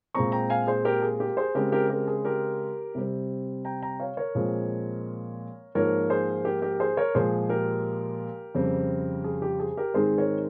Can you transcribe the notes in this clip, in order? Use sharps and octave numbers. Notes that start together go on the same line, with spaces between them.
A#2 G#3 C4 A#5 C#6
G5 A#5
F5 G#5
G#4 C5
G4 A#4
G#4
G4 A#4
G#4 C5
C#3 G#3 C4 G4 A#4
G4 A#4
G4 A#4
G#4
G4 A#4
C3 G3 C4
G5 A#5
G5 A#5
C#5 F5
A#4 C#5
A#2 F3 G#3 C4
G#2 F3 A#3 A#4 C#5
G#4 C5
G4 A#4
G4 A#4
G#4 C5
A#4 C#5
A#2 F3 G#3 G#4 C5
G4 A#4
F2 C#3 G3 C4
G#4
G4
G#4
G4 A#4
G#2 D#3 G#3 C4 G#4 C5
A#4 C#5